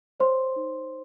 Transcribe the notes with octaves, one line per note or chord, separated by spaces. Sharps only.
C5 C#5 C6
D#4